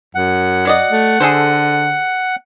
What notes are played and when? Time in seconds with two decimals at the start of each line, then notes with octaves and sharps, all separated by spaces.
0.15 F#2 F#5
0.65 F#3 D5 D#5
0.91 A3
1.20 D3 G#4 A4 C5